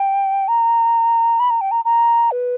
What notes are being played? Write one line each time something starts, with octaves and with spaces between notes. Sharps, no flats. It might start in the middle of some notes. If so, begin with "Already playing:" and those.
Already playing: G5
A#5
B5
A#5
G5
A#5
A#5
B4